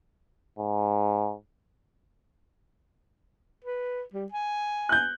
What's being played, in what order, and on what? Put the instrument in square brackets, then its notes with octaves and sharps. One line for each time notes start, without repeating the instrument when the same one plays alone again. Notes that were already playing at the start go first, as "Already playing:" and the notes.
[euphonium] G#2
[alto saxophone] B4
G3
G#5
[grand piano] F#6 G6